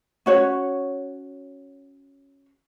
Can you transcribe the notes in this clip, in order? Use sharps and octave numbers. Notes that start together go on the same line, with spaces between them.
C#4 F#4 C#5